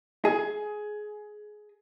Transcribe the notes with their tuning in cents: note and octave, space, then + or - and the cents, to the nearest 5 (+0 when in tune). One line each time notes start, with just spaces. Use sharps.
G#4 +20